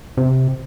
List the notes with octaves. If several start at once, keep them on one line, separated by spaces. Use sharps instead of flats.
C3